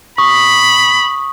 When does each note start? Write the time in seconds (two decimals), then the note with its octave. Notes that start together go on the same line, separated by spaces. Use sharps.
0.18 B5 C#6 D#6